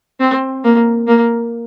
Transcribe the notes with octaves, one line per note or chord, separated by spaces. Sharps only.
C4
A#3
A#3